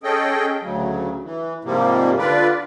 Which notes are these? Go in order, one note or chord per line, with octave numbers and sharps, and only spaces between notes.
C#4 G#4 A4 D#5 G5
D2 C#3 F#3
E3
G#2 C3 F3 G3 A#3
D3 F4 B4 D5